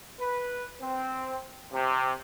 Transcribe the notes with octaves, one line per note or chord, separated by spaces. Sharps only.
B4
C4
C3